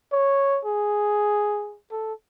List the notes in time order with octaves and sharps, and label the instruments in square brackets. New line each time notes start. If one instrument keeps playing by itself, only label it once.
[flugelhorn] C#5
G#4
A4